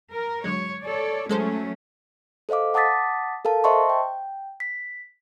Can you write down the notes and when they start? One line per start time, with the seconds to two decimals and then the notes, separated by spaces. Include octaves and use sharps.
0.11 A#4
0.44 D3 F#3 G#3 C#5
0.82 A4 C#5 D5
1.29 F#3 G#3 A3 C#4 A4 C5
2.49 A4 C5 D#5 F5 D6
2.74 F#5 A5 D6 D#6 A6 B6
3.45 A4 A#4 F5 A5
3.64 C5 D#5 E5 A5 C6 C#6
3.89 G5
4.60 B6